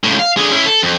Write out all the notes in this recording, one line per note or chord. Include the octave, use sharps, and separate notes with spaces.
C#2 A2
F5
D3 G#4
C#4 E4
A4
F2